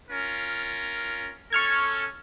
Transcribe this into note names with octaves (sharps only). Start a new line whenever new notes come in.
C#4 F4 A#4
C#4 A4 C#6 F6 G#6